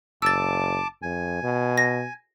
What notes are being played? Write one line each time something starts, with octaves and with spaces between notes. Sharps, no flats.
F#1 A5 D6 E6 A6
F2 G#5
B2
A#6